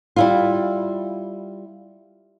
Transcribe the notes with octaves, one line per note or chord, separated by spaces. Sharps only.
G3 E4 F4